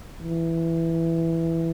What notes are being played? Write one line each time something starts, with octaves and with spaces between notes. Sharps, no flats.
E3